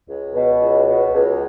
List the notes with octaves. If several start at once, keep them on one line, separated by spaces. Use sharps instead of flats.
C#2
B2
C#2
B2
C#2